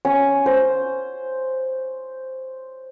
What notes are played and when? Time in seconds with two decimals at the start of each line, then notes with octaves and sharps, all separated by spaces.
0.05 C#4
0.46 C5